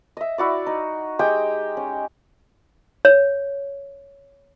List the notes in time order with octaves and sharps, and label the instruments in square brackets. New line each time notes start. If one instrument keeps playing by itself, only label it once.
[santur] D#5 E5
E4 F#4 D5
D#4
G#3 G4 G5 D#6
C#4
[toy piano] C#5